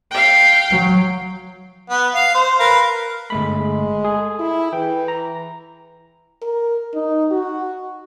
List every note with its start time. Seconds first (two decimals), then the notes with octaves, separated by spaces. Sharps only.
0.11 F5 G5
0.71 F#3
1.90 B3
2.15 F5
2.34 C5
2.60 A#4 B4 F5
3.30 G1 G#3 A3 B5
3.60 G#3
4.05 G#4 A4
4.39 E4
4.73 E3 G5
5.08 A#5
6.42 A#4
6.94 D#4
7.31 F#4